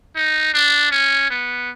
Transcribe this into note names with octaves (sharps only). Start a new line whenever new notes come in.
D#4
D4
C#4
B3